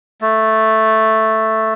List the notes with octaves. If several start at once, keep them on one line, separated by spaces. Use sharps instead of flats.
A3